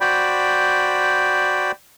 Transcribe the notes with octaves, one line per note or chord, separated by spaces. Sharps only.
F#4 C5 D5 G5 B5